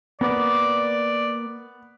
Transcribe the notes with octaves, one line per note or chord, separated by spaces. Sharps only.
A#3 B3 D5 D6